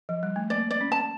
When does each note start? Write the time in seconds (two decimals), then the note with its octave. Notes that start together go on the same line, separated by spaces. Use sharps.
0.09 F3
0.23 G3
0.36 A3
0.50 A#3 D5
0.71 D5
0.81 C#4
0.92 A5